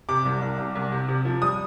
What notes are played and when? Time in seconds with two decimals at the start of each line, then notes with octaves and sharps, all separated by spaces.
0.09 C3 D6
0.25 C2
0.42 C2
0.59 C2
0.75 C2
0.92 C3
1.09 C3
1.25 F3
1.42 G3 D#6